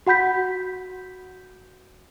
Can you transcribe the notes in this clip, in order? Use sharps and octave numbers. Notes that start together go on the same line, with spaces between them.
F#4 F#5 B5 G6 B6